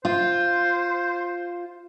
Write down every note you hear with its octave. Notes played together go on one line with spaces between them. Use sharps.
F4 C5